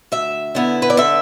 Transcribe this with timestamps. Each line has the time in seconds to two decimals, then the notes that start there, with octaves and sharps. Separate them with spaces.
0.12 D2 E5
0.55 D3 B3 E4
0.82 B4
0.90 D5
0.97 D3 E5